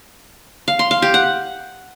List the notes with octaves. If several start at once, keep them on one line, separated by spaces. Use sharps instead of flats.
F5
C6
F5
G4
F#5